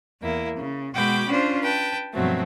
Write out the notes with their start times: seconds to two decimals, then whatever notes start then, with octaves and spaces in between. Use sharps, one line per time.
0.21 E2 A#3 E4
0.56 C#3
0.94 B2 G#3 F#4 G5 B5 D6
1.28 C#4 D4 F4 C5
1.62 B4 G5 A5
2.14 G2 B2 F3 F#3 A3 C4